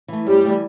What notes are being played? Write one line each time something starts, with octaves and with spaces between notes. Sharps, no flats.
E3 A3
F#2 G3
E3 A3